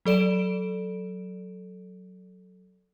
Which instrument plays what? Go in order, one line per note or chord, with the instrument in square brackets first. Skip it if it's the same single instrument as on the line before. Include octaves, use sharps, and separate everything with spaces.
[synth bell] F#3 A4 D5 D7 E7